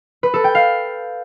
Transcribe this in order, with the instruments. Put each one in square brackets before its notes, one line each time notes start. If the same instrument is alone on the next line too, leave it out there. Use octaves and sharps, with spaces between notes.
[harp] B4
A4
G5
F5